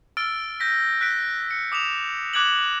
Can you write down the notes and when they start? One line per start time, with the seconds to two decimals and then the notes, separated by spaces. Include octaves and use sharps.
0.17 E6 F6 A6 D7 G7
0.60 G6 A#6 B6
1.01 F#6 B6 D7
1.51 C#7
1.72 D6 D#6 E7 F7
2.33 D6 F#6 G#6 D7 F#7